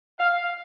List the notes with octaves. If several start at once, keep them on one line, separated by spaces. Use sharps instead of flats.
F5